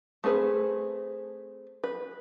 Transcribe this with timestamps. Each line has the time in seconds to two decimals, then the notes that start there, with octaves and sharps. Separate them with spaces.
0.24 A3 C4 G#4 B4
1.84 B4